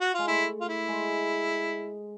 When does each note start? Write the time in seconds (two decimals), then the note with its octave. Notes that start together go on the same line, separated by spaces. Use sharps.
0.01 F#4
0.14 G#3 F4
0.28 A3 E4
0.61 F4
0.68 E4
0.88 G#3